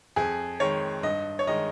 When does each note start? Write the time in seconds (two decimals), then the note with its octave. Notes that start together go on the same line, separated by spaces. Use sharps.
0.16 F2 G#4
0.60 D#3 G#3 C#5
1.03 G2 D#5
1.39 C#5
1.47 D#3 G#3 D#5